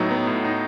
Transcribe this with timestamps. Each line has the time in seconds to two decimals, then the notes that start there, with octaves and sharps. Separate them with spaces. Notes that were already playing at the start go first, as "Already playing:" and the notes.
Already playing: A2 F#3 B3 D#4
0.11 B3
0.27 A2
0.44 D#4